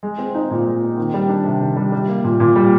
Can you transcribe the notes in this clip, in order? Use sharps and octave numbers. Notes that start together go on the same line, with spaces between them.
G#3
C4
D#4
A#2
G#3
C4
D#3
G3
D4
C3
D#3
G3
G3
A#3
A#2
A#2
G3